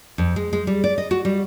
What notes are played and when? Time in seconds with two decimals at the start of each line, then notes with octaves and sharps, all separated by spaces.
0.18 F2
0.36 G#3
0.53 G#3
0.67 G3
0.84 D5
0.98 D#5
1.11 F#4
1.25 G3